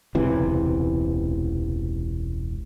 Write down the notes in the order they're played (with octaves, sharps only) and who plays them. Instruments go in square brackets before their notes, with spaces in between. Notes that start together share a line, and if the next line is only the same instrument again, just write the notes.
[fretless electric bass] E1 C#2 C3 E3